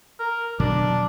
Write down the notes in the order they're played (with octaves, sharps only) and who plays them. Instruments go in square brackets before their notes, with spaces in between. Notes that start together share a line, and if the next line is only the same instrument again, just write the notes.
[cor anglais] A#4
[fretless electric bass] B2 D3 F#3 [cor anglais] D4